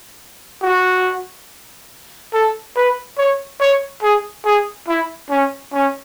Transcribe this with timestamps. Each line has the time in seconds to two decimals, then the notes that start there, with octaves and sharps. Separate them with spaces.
0.63 F#4
2.33 A4
2.76 B4
3.18 C#5
3.60 C#5
4.03 G#4
4.45 G#4
4.88 E4
5.30 C#4
5.73 C#4